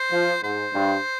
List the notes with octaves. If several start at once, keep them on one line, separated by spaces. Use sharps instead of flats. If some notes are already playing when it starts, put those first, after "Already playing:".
Already playing: C5
F3
G#2 C5
G2